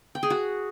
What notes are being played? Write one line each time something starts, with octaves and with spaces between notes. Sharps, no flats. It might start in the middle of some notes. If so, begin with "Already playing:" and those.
G5
G#4
F#4